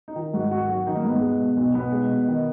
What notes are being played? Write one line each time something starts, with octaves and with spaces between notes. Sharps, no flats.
D#4
D#3 F4
G#2 F#4
G#1 F#4
F#3 F#4
D#3 D#4
A#3
G#2 B3
G#3
B2
B1
B1 B3
G#3
B2
D#3